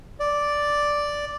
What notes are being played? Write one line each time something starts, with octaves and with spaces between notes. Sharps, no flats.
D5